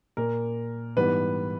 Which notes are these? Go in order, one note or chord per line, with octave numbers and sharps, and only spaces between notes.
A#2 A#3 A#4
G#2 E3 G3 B3 B4